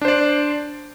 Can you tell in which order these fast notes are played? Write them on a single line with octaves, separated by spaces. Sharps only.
D4 C5 D5